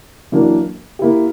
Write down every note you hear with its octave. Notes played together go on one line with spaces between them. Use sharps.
F#2 E3 A#3 D4 F#4
A#3 E4 G4